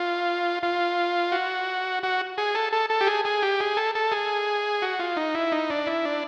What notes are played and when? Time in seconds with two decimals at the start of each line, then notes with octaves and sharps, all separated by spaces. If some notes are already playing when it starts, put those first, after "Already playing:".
Already playing: F4
0.63 F4
1.32 F#4
2.03 F#4
2.38 G#4
2.55 A4
2.73 A4
2.90 A4
3.01 G4
3.07 G#4
3.25 G#4
3.42 G4
3.60 G#4
3.77 A4
3.95 A4
4.12 G#4
4.82 F#4
5.00 F4
5.17 D#4
5.34 E4
5.52 D#4
5.70 D4
5.87 E4
6.05 D4